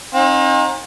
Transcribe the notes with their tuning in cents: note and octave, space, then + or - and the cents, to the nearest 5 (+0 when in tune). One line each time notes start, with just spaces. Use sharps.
C4 +45 D#4 +0 F5 +45